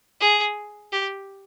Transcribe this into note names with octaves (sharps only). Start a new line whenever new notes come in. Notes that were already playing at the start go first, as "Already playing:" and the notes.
G#4
G4